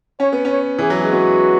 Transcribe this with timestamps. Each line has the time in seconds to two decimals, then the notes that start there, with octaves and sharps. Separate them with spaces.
0.20 C#4 C#5
0.32 B3
0.45 C#4
0.51 C#5
0.79 E3 G#4
0.90 F#3
1.00 G#3
1.12 B3 F#4